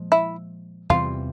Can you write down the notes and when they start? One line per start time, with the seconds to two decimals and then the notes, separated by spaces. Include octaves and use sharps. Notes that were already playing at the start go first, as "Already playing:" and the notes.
Already playing: A#2 F3 G#3
0.12 E4
0.90 E2 C3 E3 G3 F4